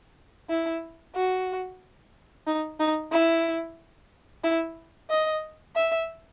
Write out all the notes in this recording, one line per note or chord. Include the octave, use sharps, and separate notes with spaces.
E4
F#4
D#4
D#4
E4
E4
D#5
E5